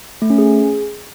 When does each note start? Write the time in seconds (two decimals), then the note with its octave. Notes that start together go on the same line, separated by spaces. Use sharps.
0.22 A3
0.30 C#4
0.38 G#4